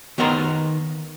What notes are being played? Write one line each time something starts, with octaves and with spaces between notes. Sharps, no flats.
D#3 B3 A#4 D#5 A#5 C6